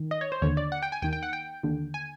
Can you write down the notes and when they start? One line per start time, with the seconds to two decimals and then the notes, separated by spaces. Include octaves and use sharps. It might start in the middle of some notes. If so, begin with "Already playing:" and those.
Already playing: D#3
0.11 D#5
0.21 C#5
0.32 C5
0.42 D#2 D3 C#5
0.57 D5
0.72 F#5
0.83 G5
0.92 G#5
1.02 D#2 D#3 G5
1.13 G5
1.23 F#5
1.33 G5
1.63 D#2 D3
1.94 G#5